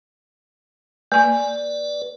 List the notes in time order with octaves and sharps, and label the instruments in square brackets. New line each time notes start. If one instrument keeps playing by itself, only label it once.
[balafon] A#3 G#5 [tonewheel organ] B4 D5